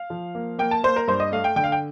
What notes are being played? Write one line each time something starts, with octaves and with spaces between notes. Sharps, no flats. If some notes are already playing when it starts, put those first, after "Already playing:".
Already playing: F5
F3
A#3
A#3 G5
A5
A#3 C5
A#4
G2 C5
D#5
A3 F5
G5
D3 G5
F5
G5